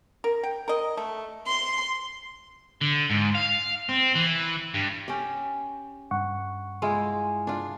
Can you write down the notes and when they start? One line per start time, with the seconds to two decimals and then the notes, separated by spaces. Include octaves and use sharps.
0.24 A#4
0.43 G5
0.68 A#4 D#5
0.97 A3
1.49 C6
2.81 D3
3.10 G#2
3.35 F5
3.89 C4
4.15 E3
4.75 G2
5.08 C#4 G4
6.11 G2 F#5 C#6
6.82 G#3 E4 F4
7.47 D4 F4